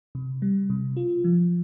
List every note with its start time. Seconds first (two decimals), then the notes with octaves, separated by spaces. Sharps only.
0.15 C3
0.42 G3
0.70 C3
0.97 F4
1.24 F3